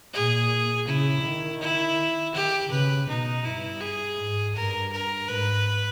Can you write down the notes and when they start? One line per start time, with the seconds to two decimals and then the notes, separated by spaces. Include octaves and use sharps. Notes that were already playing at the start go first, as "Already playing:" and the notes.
0.13 A#2 G#4
0.87 C#3 E4
1.24 D#3
1.61 E4
2.34 D#3 G4
2.71 C#3 B4
3.08 B2 D#4
3.45 G2 E4
3.81 G#4
4.18 G#2
4.55 G2 A#4
4.92 A#4
5.28 G#2 B4